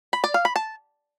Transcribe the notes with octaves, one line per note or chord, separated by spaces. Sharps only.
B5
D5
F5
B5
A5